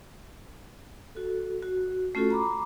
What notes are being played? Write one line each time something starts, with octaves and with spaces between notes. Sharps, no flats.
F#4 A4
F#4
A3 C#4 F4 F#4 A4
A#5 B5 D6